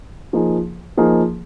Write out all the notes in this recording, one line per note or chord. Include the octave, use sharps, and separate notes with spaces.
F3 A#3 D#4 G#4
F3 A#3 D#4 G#4